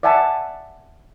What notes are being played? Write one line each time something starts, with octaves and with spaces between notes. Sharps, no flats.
D5 E5 F#5 G#5 A5